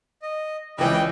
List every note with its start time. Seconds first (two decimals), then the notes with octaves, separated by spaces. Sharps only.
0.22 D#5
0.78 C#2 E3 G3 D5 D#5 G5